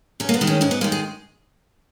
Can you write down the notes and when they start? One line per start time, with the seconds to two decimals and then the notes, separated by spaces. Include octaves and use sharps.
0.20 E2 C#4
0.29 A#3
0.34 B3
0.41 D#3 G#3
0.47 C#4
0.61 G#2 C#4
0.71 B3
0.81 D#3 G#3 A#3
0.92 G#4